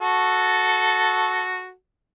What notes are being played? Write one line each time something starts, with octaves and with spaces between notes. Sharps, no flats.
F#4 A4